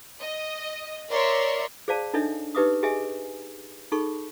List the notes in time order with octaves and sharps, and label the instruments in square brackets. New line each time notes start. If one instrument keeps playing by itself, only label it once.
[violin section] D#5
A#4 C#5 D5 E5 C6
[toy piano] G#4 C5 D5 F5 A5
D4 D#4 A4 C#5 D#5 E5
D#4 G4 B4 E5 D6 D#6
G4 G#4 D#5 E5 G#5
D#4 G#4 A4 B5 C#6